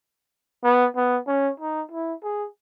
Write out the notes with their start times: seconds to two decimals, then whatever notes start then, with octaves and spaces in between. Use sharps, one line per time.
0.64 B3
0.96 B3
1.27 C#4
1.60 D#4
1.91 E4
2.24 G#4